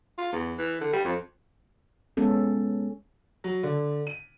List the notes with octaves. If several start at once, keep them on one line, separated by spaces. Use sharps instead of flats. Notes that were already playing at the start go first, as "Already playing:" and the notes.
F4
E2
E3
D3
G3
F2
G#3 B3 C#4 A4
F#3
D3
D#7